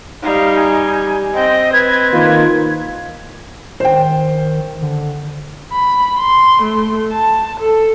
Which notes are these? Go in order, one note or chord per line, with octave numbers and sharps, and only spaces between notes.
G3 D#4 F5
G#5
C4 D#5 G5
B4 G#6
D#3 A#3 F4 G#6
D#3 C5 G5
D3
B5
C6
A3
A5
A4